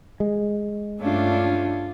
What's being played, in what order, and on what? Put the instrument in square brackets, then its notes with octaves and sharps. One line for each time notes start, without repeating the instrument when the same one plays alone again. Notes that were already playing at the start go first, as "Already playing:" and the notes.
[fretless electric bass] G#3
[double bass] G2 A3 [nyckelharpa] C#4 F4 [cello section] D4